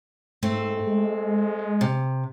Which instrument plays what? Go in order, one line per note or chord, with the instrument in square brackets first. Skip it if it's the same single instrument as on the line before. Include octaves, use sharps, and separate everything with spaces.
[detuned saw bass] G#2 [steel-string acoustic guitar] A3 C4
[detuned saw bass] G#3
[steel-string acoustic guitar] C3